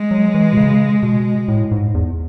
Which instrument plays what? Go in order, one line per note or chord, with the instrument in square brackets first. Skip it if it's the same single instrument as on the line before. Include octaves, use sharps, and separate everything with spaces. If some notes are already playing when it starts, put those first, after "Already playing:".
Already playing: [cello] G#3
[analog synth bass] F#3
E3
B2
C#3
B2
A2
G#2
E2